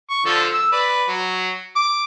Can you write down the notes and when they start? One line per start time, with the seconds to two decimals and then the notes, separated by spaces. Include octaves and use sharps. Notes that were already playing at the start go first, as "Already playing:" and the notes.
0.10 C#6
0.26 D3 F3 A4
0.53 E6
0.72 B4 D5
1.09 F#3
1.76 D6